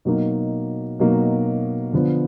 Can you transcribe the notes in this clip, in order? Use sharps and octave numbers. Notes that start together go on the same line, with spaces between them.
B2 F#3 A#3 D#4
B2 F#3 A#3 D#4
D3 F3 B3 D4